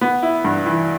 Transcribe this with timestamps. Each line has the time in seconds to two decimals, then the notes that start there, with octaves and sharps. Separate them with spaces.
0.01 B3
0.23 E4
0.44 G2
0.66 E3